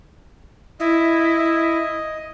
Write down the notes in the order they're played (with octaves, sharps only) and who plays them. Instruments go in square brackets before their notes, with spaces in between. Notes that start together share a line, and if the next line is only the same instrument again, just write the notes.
[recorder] E4 [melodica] D#5